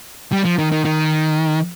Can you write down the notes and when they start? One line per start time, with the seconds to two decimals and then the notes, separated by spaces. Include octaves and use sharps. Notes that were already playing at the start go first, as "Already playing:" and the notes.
0.32 G3
0.45 F3
0.59 D#3
0.72 D#3
0.85 D#3